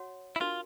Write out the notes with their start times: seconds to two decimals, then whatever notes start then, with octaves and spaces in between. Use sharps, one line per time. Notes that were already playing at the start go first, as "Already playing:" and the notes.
Already playing: F#4 C#5 F#5
0.36 E4
0.41 D4 F4 F#4 A#4